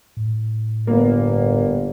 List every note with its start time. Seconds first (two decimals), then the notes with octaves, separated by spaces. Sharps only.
0.17 A2
0.87 G1 A#3 B3